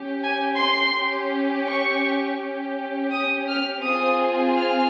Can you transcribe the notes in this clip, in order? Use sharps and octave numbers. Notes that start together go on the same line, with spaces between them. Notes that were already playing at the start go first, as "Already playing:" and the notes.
Already playing: C#4 G4
G#5
C6
C#4 G4
C#6
C#4 G4
D#6
F6
C4 F4 G#4 D#6
F6